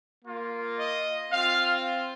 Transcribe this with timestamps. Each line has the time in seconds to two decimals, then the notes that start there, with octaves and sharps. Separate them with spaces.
0.24 A#3 F4
0.78 D#5
1.32 C4 F4 F5